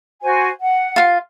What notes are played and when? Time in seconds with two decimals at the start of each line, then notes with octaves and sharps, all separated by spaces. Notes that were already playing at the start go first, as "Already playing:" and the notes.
0.22 F#4 C5 G#5
0.60 F#5
0.96 F4 F5